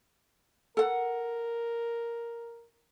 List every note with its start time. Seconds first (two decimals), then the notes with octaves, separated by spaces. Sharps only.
0.77 A4 A#4 F#5